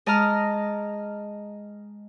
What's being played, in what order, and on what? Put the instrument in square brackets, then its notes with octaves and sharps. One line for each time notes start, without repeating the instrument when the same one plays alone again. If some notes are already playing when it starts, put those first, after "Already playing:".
[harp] G#3 D#5 A5 A#5 F6